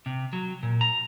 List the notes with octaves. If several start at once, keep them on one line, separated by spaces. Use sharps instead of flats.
C3
F#3
A#2
A#5